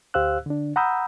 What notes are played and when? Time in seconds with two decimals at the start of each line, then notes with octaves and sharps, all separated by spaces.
0.14 D2 G4 C5 F5 E6 F#6
0.46 D3 D4
0.76 F#5 A#5 B5 D#6 E6 G6